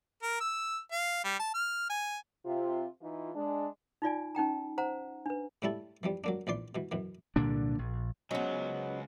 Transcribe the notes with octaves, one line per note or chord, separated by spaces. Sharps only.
A#4
E6
F5
G3
A5
F6
G#5
C3 F4
E3 D#4 F4
G#3 D4
D#4 F4 D5 G#5
C#4 D#4 G5 A#5
C5 F#5 A#5
D4 B4
A2 G3 A3 E4 A5
E3 F3 G3
F#3 A#3 D4
A#1 E3 D5 C6
B2 E3
F#2 B2 E3
C2 A#2 D3 D4
A#1
C#2 C#3 F#3 B3 C#4 C5 D#5